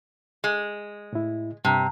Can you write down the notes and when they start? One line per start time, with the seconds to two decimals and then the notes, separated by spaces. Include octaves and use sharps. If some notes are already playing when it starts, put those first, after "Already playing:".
0.44 G#3
1.13 A2 E4
1.65 G2 C3 A5 A#5